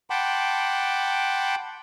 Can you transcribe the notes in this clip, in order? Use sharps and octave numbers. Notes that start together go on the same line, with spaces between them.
F#5 G5 A5 B5 C6 D6